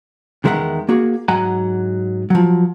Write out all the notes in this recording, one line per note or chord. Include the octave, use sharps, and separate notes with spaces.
E2 D#3 G#3 A#4 E5 F#5
A#3 F#4 G#4
G#2 F#3 F#5 G#5 A#5
F3 F#3